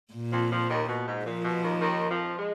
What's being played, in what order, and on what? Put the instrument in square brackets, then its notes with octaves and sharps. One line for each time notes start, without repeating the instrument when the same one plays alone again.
[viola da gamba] A#2
[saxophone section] F2 F3
F2 F3
D#2 D#3
B2
G#2
[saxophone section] A#2 [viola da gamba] F3
[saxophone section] B2
D#2 D#3
D#2 D#3
F2 F3
G#3